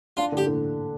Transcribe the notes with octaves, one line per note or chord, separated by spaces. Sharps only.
D4 F4
D3 G4
D3